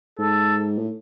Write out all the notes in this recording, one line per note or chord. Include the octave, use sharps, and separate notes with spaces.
G#2 A4
A2